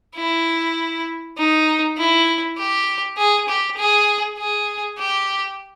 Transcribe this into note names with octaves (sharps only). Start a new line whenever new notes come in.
E4
D#4
E4
G4
G#4
G4
G#4
G#4
G4